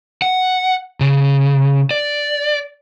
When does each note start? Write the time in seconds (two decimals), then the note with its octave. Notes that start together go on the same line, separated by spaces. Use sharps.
0.22 F#5
1.01 C#3
1.91 D5